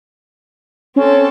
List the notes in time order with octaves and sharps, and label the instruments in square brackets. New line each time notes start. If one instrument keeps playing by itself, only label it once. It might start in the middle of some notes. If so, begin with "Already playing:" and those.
[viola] C4 A4 [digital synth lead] C#4